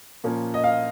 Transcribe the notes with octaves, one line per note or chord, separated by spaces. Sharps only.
A#2 F3 A#3 C#4
D#5
F5